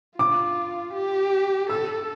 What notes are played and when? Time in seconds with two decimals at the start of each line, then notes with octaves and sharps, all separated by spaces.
0.18 F4 D6
0.95 G4
1.69 A4 E6